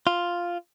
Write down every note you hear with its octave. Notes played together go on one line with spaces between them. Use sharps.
F4